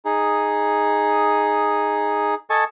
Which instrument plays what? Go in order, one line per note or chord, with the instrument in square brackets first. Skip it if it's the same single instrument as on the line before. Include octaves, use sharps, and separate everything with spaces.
[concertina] D#4 G#4
A4 D#5 G#5 A5 C#6